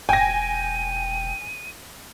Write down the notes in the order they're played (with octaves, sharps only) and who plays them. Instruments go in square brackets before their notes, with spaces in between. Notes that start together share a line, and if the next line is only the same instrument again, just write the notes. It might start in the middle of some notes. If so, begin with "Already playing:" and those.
[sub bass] E1 [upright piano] G5 [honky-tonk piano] G#5 A#6 [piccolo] D#7